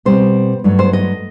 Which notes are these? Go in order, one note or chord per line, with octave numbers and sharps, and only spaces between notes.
B2 G3 C4 C5
G2 F#3 A3
C5
D#5